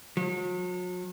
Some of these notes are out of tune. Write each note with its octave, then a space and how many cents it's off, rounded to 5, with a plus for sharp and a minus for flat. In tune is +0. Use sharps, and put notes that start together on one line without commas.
F#3 -45